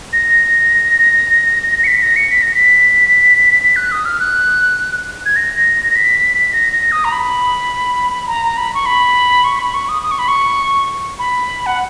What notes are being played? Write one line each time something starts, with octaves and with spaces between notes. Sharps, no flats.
A#6
C#7
B6
A#6
C#7
B6
A#6
B6
B6
F#6
D#6
F6
F#6
G#6
A#6
B6
A#6
A#6
D#6
A#5
B5
A#5
B5
C#6
B5
C#6
B5
C#6
D#6
D#6
C#6
B5
C#6
B5
F#5